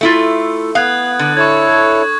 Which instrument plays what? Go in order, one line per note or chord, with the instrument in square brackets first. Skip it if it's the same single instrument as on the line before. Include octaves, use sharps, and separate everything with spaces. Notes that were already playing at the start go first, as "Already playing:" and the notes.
[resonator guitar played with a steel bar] A3 E4 F4
[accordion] B3 [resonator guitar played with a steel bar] F5 [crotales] D#6 F#6 G#6
[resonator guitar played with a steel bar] D3
[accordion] E4 A4 C#5 [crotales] C#6 G#6